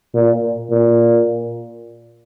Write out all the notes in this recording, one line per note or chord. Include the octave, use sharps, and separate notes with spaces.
A#2
A#2